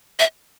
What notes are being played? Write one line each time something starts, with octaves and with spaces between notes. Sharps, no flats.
E5